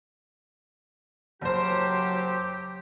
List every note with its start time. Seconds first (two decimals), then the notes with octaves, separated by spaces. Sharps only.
1.41 F#1 F#3 G4 C5